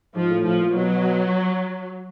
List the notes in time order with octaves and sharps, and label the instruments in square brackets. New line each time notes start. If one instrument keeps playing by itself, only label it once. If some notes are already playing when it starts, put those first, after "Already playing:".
[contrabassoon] G#2 [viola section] F3
[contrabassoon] A2
[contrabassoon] A2 [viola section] F3
[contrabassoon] A#2
[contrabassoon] B2 [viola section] F#3